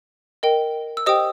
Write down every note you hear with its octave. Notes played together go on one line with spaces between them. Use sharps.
A#4 D#5 G5
E6
G4 C5 D#5 G5 D#6